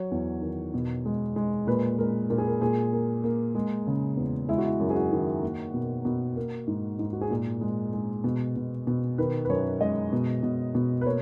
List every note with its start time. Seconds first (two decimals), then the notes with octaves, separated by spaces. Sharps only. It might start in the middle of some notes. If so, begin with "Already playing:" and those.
Already playing: F#3 C#5
0.11 E2
0.42 D#3
0.74 B2
1.05 G#3
1.36 G#3
1.67 A#2 B4
1.99 G#3 A#4
2.30 A#2 A#4
2.38 G#4
2.47 A#4
2.61 A#2 G#4
2.93 A#3
3.24 A#3
3.55 G#3
3.87 C#3
4.17 E2
4.49 G#3 E4
4.58 F#4
4.66 E4
4.80 F#2
4.90 G#4
4.96 F#4
5.11 D#3
5.43 A#3
5.74 B2
6.05 B2
6.36 A#3
6.67 G#2
6.99 G#2
7.13 F#4
7.21 G#4
7.30 A#2 A#4
7.61 G#3
7.93 G#3
8.24 B2
8.56 B2
8.87 B2
9.18 D#3 B4
9.45 B4
9.49 F#2 C#5
9.80 G#3 D#5
10.13 B2
10.43 B2
10.75 B2
11.01 B4
11.06 A#3 C#5